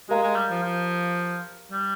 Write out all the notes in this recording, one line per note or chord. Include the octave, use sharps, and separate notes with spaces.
G#3 G4 A#4 F5 A#5
G#3
G3
F3
F3
G3